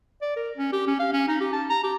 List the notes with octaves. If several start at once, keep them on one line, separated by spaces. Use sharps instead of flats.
D5
A#4
C#4
G4
C#4
F5
C#4
D#4
G4
A5
A#5
G4